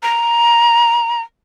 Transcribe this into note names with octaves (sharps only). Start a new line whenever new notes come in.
A#5